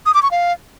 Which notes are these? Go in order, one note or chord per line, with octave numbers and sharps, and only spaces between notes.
D#6
D6
C#6
F5